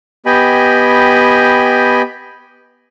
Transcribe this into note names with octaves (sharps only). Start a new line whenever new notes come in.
B3 G4 D#5 G5 G#5 B5